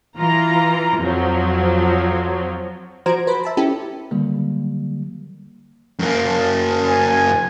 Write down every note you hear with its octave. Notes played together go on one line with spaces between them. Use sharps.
E3 F4 A#5
F2 F3 F#3
F3 F#4 C5 A#5 G#6 D7
B4 C5 B5
E5 A5 B5
C#4 E4 G4 A4
D3 D#3 F#3 G3 A#3
F#2 A#3
G#5